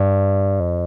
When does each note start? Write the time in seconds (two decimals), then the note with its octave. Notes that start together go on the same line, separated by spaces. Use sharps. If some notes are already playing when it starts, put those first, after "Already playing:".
Already playing: G2
0.60 F2